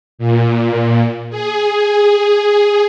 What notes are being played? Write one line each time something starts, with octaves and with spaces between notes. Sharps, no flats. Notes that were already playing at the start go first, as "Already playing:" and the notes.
A#2
G#4